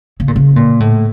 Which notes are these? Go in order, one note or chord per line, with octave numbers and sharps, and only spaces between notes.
C#3
A#2
C#3
A#2
A2